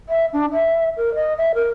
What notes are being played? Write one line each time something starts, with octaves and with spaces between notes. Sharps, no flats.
E5
D4
E5
A#4
D#5
E5
A#4